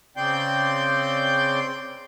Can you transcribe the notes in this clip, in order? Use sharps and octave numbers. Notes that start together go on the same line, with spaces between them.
C#3 C4 D5 G5 C6 G6